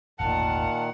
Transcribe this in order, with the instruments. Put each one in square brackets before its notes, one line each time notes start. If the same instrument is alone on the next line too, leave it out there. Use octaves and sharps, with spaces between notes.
[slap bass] E1 A1 E2 [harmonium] A#2 D#3 [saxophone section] F5 F#5 [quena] A5